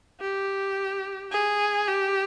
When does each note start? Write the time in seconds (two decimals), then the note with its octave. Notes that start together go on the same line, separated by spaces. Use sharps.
0.21 G4
1.31 G#4
1.87 G4